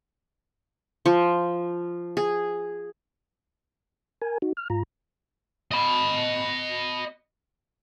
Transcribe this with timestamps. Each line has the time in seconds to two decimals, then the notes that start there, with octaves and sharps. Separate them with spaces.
1.06 F3
2.17 G#4
4.22 A#4 G#5
4.42 D#4 F#4
4.57 F6
4.70 G#2 F4 A#5
5.71 D#5 B5